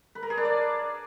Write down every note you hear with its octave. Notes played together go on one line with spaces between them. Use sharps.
B4
A#4
G#4
D4
D5